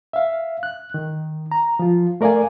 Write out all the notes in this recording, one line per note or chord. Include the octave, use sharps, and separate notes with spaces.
E5 F5
F#6
D#3
A#5
F3 F4
A3 A#4 D5 F5 G#5